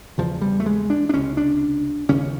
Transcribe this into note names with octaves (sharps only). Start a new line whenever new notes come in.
E2 C#3 F3
G3
A3
G#3
D4
D4
C#2 C3 C#4
D4
D#2 C#3 C#4